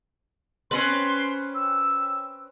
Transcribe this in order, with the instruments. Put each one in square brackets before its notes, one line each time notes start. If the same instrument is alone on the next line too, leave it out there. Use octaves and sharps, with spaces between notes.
[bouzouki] C4 C#4 B4 [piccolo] C6
[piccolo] E6